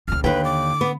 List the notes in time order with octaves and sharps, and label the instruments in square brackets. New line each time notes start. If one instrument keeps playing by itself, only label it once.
[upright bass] C#2 C#3 [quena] F6
[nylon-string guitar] D#2 G5 [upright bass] D3 [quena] B4
[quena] D6
[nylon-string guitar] B3